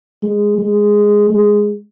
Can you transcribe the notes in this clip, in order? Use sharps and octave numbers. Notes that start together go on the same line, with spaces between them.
G#3
G#3
G#3